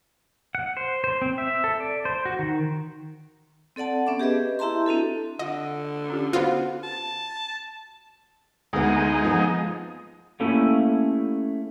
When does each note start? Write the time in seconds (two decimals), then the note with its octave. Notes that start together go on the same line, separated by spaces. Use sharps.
0.55 F#5
0.77 C5
1.04 C5
1.22 C4
1.38 E5
1.64 A4
1.80 D5
2.05 C5
2.25 F#4
2.39 D#3
3.76 C4 A4 D5 F#5 A5
4.07 B3 C#4 E5 D6
4.20 G4 G#4 B4 D#5
4.59 E4 G4 E5 A5 A#5 C6
4.86 C4 D4 F#4 A4
5.39 D3 F4 D#5 F#5
6.10 C#4 F4 G4
6.33 B3 F4 F#4 C5 F#5
6.83 A5
8.73 D2 G#3 B3 D#4
9.25 F3 B3
10.40 A3 A#3 C#4 E4 G4 A4